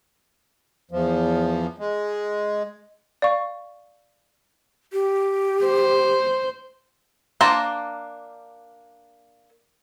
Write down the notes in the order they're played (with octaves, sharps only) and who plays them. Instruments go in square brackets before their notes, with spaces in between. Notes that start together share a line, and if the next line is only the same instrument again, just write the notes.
[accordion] E2 F3
G#3
[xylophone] D5 F5 C#6
[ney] G4
[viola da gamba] C5
[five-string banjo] A#3 D4 C5 A5 A#5